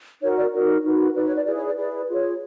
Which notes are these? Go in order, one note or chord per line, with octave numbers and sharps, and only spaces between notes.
D#4 F#4 A#4 C#5
D5
D#4 F#4 A#4
D#4 F#4 B4
D#4 F#4 B4 D5
C#5
D5
E4 G#4 B4 D5
C#5
D5
E4 G#4 B4 D5
F4 G#4 C#5